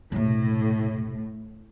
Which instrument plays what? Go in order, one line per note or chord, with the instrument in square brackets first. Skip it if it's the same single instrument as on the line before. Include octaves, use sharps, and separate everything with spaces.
[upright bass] E1 C3 [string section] A2